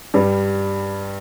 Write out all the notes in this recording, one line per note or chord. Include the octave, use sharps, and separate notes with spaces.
G2 G3